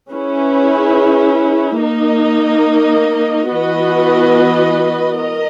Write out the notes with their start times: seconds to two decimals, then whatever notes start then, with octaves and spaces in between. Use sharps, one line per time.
0.11 C#4 E4 G#4 B4
1.80 A#3 D#4 A#4 D#5
3.49 E3 B3 F#4 B4 D#5
5.18 A#4 D#5